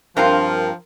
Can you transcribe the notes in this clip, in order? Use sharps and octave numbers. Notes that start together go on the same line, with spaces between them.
G2 F3 C4 F4 A#4